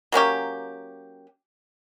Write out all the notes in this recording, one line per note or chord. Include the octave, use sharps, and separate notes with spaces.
F#3 A#3 C#4 G4